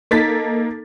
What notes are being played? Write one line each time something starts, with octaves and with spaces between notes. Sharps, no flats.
A#3 D#4 A4 A6 B6